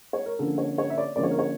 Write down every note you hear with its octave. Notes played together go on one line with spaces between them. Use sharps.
C#5
A#4
D3 F3 A#3 C#4 A4
C#5
C#5
E5
D5
D3 F3 A#3 C#4 D5
C#5
A#4
C#5